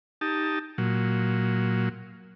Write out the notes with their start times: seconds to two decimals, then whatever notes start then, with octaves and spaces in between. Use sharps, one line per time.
0.21 D#4 G4 A5
0.78 A#2 F#3